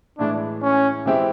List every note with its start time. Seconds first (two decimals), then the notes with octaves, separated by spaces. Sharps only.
0.18 A2 E3 G#3 D4
0.62 C#4
1.06 E3 G#3 C4 E4 G4